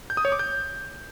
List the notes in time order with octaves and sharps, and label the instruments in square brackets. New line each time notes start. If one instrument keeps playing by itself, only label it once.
[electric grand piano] G6
D#6
C#5
D6
G6